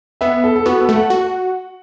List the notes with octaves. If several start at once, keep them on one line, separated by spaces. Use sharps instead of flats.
B3 E5
A4
A4
B3 F#4
A4
A3
F#5
F#4